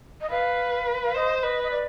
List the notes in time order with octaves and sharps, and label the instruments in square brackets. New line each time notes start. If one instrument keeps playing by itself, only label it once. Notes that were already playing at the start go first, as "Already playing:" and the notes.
[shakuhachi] D#5
[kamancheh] B4 [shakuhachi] F5
[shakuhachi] F5
[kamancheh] C5 [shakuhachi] D#5
[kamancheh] B4 [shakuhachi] D#5
[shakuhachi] D#5
D5